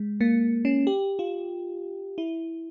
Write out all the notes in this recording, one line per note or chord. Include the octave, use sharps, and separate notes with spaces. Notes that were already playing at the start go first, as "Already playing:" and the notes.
Already playing: G#3
A#3
C#4
G4
F4
E4